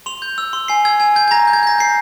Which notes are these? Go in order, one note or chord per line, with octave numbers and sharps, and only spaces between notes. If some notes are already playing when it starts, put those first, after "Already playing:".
C6 F7
G6
E6
C6
G#5 C7
E6 G#6
G#5 G#6
G6 G#6
G#6
A#5 A#6
G6
G#6
G6 A#6
G6 C7